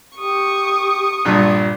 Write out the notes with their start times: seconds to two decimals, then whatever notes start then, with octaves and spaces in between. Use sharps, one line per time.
0.18 G4 C#6 D#6
1.25 A#1 G2 A#2